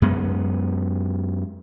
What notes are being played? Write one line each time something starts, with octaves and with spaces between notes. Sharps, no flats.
F#2 G#3 B3